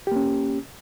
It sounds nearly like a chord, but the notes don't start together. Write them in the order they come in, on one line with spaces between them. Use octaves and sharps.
G4 A#3 C#4